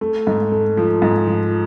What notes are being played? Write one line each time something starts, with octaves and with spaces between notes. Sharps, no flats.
A3
G#2
A3
F3
G#2
F3